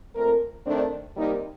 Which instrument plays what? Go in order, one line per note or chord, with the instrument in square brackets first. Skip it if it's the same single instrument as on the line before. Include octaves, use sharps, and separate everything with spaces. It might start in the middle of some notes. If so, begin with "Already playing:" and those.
[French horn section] A#2 A3 C4 A#4
D#3 A3 C4 D4
C3 G3 A#3 D#4